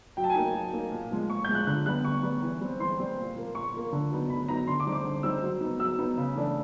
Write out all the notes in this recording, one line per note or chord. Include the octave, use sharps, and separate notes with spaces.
F#3 G5
A5
G#5
A#3 D#4
F#3
A#3 D#4
A#2
F3 G#3
A#2 C#6
F3 G#3 G6
F#6
D3 F#6
G3 B3 F#6
D3 C#6
G3 B3
E3
G3 C4
E3 C6
G3 C4
A#2
F3 A#3
A#2 C#6
F3 A#3
D3
F#3 B3 D#4
D3 B5
F#3 B3 D#4 A#5
D3 C6
D6
G3 C4 D#4
D6
D3
G3 C4 D#4 E6
F#3
B3 D#4
F#3 E6
B3 D#4
C#3
E3 A3 D4